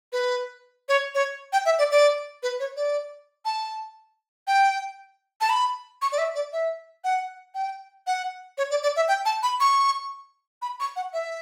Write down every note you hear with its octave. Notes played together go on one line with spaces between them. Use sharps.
B4
C#5
C#5
G5
E5
D5
D5
B4
C#5
D5
A5
G5
A5
B5
C#6
D5
E5
D5
E5
F#5
G5
F#5
C#5
D5
D5
E5
G5
A5
B5
C#6
B5
C#6
F#5
E5